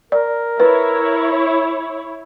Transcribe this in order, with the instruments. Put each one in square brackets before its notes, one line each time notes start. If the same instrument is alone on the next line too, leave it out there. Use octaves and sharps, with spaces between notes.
[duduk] A#4 [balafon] D5
[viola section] E4 C#5 [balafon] B4